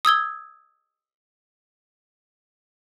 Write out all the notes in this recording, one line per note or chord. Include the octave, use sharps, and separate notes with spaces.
D#6 E6 G#6 G7